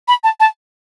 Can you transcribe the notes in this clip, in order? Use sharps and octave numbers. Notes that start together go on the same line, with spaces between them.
B5
A5
A5